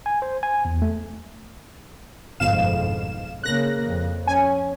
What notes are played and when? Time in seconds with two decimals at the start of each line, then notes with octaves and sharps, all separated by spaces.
0.06 G#5
0.22 C5
0.43 G#5
0.65 E2
0.82 A3
2.40 G1 F2 G#2 B2 F5 E7
3.44 C#3 A#3 F#6 A#6
3.86 F2
4.27 C#4 G#5